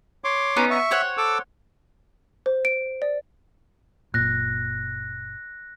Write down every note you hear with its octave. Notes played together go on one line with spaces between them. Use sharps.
C#5 C6 D6
B3 C#4 D#4
E5 C#6
C5 C#5 F#5
A4 D6 E6
C5
D7
D5
F#1 A#2 F#6 A#6